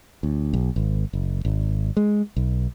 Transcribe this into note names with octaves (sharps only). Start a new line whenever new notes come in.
D2
B1
G#1
F#1
G#1
G#3
B1